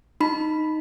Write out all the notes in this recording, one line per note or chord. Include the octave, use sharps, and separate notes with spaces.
D#4 B5